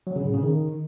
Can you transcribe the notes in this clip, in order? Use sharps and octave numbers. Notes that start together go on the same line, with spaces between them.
F#3
C#3
A2
C#3
D#3